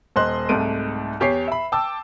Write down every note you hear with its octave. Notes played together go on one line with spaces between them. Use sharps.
D#1 C5 D#5 C6 F#6
C2 G#2 A3 D7 D#7
E2 G4 C#5 C7
E5 B5
G5 A5 D6 E6